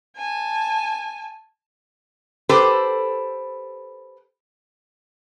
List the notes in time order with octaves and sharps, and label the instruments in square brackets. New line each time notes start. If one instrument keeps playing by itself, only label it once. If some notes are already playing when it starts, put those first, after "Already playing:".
[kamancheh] G#5 A5
[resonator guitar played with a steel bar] G4 A4 B4 C5